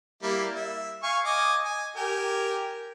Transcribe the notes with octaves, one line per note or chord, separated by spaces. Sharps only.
G3 A#3 E4
E5
F5 G#5 C#6
D#5 G#5 D6
G#5
G4 A#4 G#5